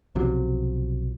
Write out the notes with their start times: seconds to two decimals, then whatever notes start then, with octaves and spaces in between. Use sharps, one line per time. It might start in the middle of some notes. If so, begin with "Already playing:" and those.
0.15 B1 C3 F3 F#3